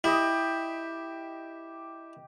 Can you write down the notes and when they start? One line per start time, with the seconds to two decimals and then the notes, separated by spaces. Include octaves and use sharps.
0.04 E4 G4 D#5